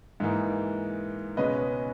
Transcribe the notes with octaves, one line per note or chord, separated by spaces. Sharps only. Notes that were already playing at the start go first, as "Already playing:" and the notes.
G#2 E3 A#3 D#4
C#2 B2 G#3 C#4 B4 D#5